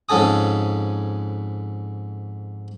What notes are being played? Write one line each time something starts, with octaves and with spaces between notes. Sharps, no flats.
F2 G#2 C#4 A4 G#5 D#6